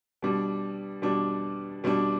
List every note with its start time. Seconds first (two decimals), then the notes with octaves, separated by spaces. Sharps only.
0.22 B2 G3 D4
1.02 B2 G3 D4
1.84 B2 G3 D4